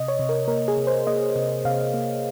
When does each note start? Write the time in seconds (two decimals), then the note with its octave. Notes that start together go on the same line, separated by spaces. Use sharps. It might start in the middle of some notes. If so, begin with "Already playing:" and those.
Already playing: C3 D#5
0.08 C#5
0.19 C3
0.29 A#4
0.48 A#3 A#4
0.68 G#4
0.77 C3
0.87 C5
1.07 A#3 D#5
1.36 C3
1.65 C3 F5
1.94 A#3